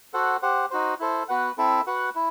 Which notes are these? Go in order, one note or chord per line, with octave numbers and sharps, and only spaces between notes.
F#4 A4 C5 F#5
G4 C5 F#5
D#4 F#4 C5
E4 A4 C5
B3 F#4 B4 F#5
C4 E4 A4 E5
F#4 B4 F#5
E4